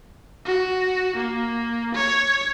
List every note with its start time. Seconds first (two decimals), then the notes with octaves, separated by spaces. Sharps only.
0.45 F#4
1.17 A#3
1.95 C#5